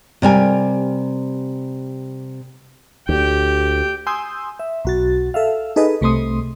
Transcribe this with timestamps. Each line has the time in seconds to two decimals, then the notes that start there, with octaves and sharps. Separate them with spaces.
0.22 C3 G3 A#4 G#5
3.09 D2 G4 G5
4.07 G#5 C6 D#6 E6 G6
4.59 E5
4.85 B1 F#4 A6
5.34 A4 E5 F5
5.76 D#4 G#4 A4 B4 D#5
6.01 C2 C3 A3 C6 D#6